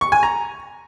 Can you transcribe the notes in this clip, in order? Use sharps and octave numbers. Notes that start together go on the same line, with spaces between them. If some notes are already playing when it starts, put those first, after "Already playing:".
C#6
G#5
A#5